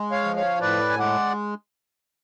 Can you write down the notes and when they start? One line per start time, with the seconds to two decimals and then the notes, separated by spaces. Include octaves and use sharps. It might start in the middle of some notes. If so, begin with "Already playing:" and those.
Already playing: G#3
0.11 C#5 F5
0.24 F3
0.36 C#5 F5
0.61 A2 B4 D5
0.89 G#5
0.99 G#3 D5 F#5